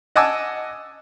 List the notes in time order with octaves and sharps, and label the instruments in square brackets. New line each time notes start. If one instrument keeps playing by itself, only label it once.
[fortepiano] D#5 F#5 G#5 A5 D6 E6